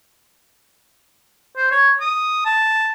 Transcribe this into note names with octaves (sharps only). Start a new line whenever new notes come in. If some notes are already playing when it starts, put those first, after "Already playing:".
C5
C#5
D#6
A5